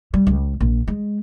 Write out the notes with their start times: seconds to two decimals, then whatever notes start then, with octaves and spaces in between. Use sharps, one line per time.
0.14 G3
0.27 C#2
0.60 A#1
0.88 G#3